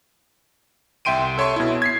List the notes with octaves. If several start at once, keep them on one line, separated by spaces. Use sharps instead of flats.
C2 E5 G5 C6 D7 D#7
A4 C#5 E5 C6 C#6
B2 E4
G#6 B6 C7